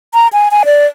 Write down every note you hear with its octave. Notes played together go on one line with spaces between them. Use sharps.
A#5
G#5
G#5
D5